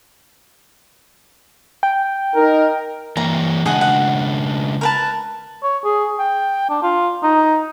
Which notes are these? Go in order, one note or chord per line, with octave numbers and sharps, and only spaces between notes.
G5
D#4 A#4
E3 A#3 A#5
C#3 G#3 D4 G#4 D#5 F#5
F#5
A#4 B4 A5
C#5
G#4
G5
D4
F4
D#4